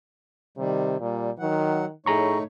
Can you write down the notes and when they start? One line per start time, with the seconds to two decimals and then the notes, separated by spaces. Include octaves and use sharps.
0.58 C3 D#3 G3
1.00 A#2 G3
1.39 D#3 F#3 F#5
2.06 A2 A3 D#4 G#4 C#5 A#5 C#6